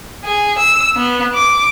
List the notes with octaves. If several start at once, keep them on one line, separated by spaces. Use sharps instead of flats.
G#4
E6
B3
D6